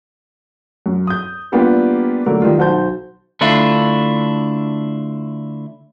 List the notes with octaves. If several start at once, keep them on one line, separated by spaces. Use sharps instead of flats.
F#2
D#6 G6
G3 A#3 B3 D4 F4 G4
D3 F#3 A3 A#3 A#4
D#3 G3 F4
B1 F#4 C5 A5 G6
D3 A3 D4 E4 F4